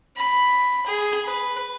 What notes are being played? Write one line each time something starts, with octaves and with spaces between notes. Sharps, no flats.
B5
G#4
B4